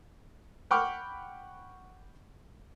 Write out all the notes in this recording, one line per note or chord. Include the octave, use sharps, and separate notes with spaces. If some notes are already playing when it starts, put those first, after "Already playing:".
F#5 G5 B5 C#6 D6 F6